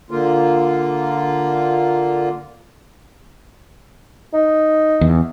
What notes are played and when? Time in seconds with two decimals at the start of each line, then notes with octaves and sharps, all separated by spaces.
0.11 D3 A#3 F4
4.34 D#4
5.01 E2